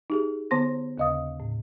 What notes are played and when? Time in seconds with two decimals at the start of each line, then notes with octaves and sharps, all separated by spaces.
0.10 D#4 G4 G#4
0.51 D3 B3 C5 C6 A#6
0.98 D#2 C#3 D#5 F5 D#6
1.40 A2